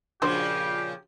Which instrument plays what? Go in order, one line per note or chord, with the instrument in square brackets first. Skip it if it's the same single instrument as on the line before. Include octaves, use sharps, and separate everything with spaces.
[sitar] A#2 C#3 F3 [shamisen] D4 F#4 C5 [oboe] G4